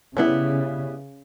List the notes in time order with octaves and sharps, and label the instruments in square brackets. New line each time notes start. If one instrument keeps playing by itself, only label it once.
[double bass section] C#3 [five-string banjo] G3 B3 E4